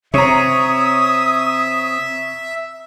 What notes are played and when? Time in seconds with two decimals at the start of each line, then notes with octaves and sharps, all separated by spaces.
0.14 C3 C#5 E5 A#5 D#6